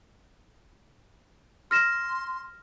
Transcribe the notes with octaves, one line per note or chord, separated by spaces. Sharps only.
C6 F6 A#6 E7